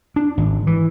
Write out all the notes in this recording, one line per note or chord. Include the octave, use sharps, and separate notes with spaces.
D4
G#1
E3